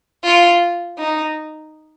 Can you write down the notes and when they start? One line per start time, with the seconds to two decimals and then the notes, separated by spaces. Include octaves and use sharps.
0.24 F4
0.98 D#4